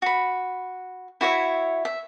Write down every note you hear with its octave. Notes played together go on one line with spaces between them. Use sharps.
F#4 B5
E4 F#4 C#5 E5
E5